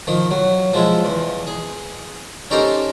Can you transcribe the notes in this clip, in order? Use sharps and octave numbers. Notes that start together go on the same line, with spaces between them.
D#3 F3
F#3
F3 G#3 E4
E2
G#4
C#4 D#4 G4 A4 A#4 C5